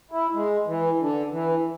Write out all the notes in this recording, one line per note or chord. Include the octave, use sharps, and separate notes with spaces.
E4
G#3
E3
D3
E3